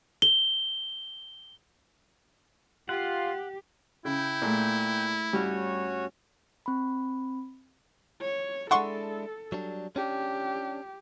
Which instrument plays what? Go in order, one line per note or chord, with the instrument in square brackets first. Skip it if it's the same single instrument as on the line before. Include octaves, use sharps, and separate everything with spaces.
[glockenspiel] G7
[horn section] F4 [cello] G4 [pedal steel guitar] F#5
[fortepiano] C#3 [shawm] E4 [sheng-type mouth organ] G5 G6
[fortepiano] A#2 [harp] A3 G#4
[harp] G2 [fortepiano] G3 [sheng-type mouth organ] C#4 F#4 C#5
[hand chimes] C4 B5
[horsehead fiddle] C#5
[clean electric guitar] G#3 D4 E4 [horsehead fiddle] A4 [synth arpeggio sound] F#5 C6 C#6
[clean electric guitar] F#3 G3 D4
[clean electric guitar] C#4 D4 [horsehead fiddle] G4